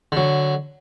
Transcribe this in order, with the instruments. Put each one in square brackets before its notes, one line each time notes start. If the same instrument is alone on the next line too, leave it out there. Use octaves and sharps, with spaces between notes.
[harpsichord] D3 F#3